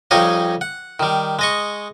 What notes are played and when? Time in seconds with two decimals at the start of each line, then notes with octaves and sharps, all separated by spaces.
0.11 F2 G3 D#4 G#4 C#5 D#5
0.61 F#5
1.00 D#3 G3
1.39 G#3 D#5 C#6